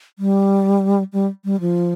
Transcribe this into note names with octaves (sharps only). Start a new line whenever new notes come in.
G3
G3
G3
F3